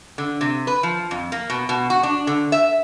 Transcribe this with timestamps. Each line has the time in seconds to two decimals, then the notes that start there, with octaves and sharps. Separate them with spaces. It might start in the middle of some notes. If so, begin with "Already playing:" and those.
0.18 D3
0.41 C3
0.67 B4
0.83 F3
1.11 F2
1.32 A#3
1.50 B2
1.69 B2
1.90 F#4
2.03 D4
2.27 D3
2.52 E5